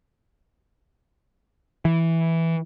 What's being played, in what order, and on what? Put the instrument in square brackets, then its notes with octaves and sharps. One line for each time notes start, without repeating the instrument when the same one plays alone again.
[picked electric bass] E3